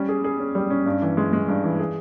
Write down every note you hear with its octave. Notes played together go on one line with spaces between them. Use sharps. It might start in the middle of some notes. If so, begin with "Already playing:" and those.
Already playing: G3 C#4
G#4
G#4
C#4
G3
C#4
G2
E3
G#3
G#3
G2
E3
G#4